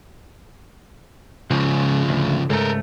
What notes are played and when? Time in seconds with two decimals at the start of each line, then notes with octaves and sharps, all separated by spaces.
1.51 C#2 C#3 F3
2.09 D2
2.50 C#2 G#2 A3 A4 A#4